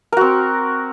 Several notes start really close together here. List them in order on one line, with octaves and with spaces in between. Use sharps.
A#4 F#4 C4